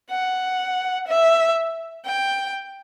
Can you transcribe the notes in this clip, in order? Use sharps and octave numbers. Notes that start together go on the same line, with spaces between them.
F#5
E5
G5